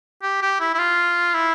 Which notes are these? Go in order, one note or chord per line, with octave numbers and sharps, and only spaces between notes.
G4
G4
E4
E4
F4
E4